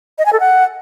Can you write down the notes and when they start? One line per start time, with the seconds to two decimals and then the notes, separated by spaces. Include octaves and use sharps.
0.18 D#5
0.26 G#5
0.33 A4
0.40 F#5